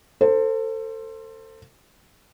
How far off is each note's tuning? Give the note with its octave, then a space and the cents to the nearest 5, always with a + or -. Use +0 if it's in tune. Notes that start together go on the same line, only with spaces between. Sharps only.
A4 +30 C5 +5